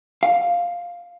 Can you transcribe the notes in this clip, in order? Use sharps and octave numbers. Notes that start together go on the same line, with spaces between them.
F5